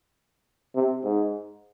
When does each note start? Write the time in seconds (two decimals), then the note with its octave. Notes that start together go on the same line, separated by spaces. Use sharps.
0.75 C3
1.04 G#2